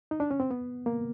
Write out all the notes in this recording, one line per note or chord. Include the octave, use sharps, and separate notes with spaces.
D#4
D4
C#4
C4
B3
A#3